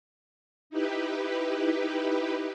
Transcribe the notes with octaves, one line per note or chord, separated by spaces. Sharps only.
D#4 E4 G4 B4